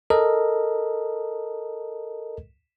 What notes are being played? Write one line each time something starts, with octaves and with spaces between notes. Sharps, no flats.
A4 A#4 D#5